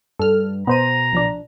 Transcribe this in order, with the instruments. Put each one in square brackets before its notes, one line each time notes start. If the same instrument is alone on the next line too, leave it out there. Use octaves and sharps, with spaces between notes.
[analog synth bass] G2 [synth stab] A4 F6
[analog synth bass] B2 [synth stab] B3 C5 D#7 [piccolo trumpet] A#5
[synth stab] B1 F3 D4